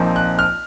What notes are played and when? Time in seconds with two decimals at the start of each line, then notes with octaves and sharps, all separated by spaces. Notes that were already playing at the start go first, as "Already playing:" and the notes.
Already playing: A#1 A#2 F3 C4 D#4
0.16 F#6
0.39 F6